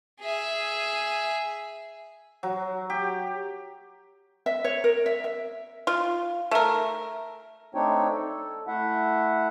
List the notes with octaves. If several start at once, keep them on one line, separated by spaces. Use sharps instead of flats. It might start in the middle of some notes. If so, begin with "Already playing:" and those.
G#4 E5
F#3
G4
E5
C#5
A#4
E5
E5
F4
A3 A#4
A3 C4 D4 D#4 C#5 G5
A4
A3 E4 E5 F#5